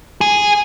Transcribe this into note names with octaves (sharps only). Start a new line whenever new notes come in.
G#4